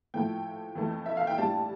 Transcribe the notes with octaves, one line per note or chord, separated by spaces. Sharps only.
A2 F3 A3 G5
F2 E3 A3
E5
F5
G5
A2 G3 D4 A5